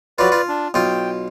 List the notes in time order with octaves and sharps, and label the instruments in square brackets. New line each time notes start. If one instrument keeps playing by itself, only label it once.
[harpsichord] F#3 F4 [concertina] B4 D5
[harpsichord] F4
[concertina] D4
[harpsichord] B1 F4 [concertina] G5